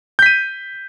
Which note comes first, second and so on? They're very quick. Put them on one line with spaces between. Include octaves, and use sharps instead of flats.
G6 B6 D#7